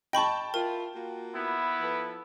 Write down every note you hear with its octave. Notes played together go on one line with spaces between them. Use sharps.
D#5 G5 A5 B5 C#6
E4 F4 A#4
A#3 F4 F#4
B3 E4
F3 A4 B4